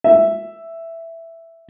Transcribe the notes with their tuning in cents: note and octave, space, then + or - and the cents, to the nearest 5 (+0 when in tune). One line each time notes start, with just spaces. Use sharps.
E5 +5